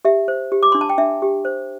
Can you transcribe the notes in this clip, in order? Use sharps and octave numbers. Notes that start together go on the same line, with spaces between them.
G4 E5
C5
G4
D6
D4 C6
A5
G5
D4 E5
G4
C5